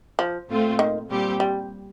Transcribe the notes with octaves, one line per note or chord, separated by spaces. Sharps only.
F3
A#2 A3 C4 F4
D#3
A#2 G3 C4 G4
G3